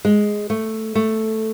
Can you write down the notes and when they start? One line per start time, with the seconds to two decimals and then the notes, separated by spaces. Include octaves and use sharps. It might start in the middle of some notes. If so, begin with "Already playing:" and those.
0.05 G#3
0.50 A3
0.95 A3